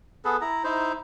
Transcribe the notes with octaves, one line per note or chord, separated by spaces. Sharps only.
B3 G#4 A4 B4
E4 A#5
D#4 E4 C5